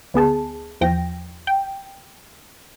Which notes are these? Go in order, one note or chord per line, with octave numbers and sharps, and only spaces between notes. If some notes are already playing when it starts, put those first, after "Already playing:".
D2 B3 G#4 A5
E2 F3 G5 A#6
G5